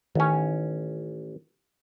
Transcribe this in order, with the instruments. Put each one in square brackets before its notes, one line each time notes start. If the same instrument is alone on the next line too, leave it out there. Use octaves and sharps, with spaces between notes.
[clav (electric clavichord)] A1 C#4 [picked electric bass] D#3